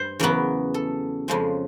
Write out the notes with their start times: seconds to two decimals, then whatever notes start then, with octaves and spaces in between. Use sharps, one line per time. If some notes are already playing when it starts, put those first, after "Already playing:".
Already playing: G2 C5
0.20 E2 C#3 F#3 B3 A#4
0.74 A4
1.28 F2 C#3 F3 G#3